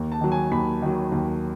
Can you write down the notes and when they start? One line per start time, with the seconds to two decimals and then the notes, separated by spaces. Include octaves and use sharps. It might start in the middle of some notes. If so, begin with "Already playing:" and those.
Already playing: D#2
0.12 A5
0.21 D#3 F#3
0.32 G#5
0.51 D#2 B5
0.82 D#3 F#3
1.12 D#2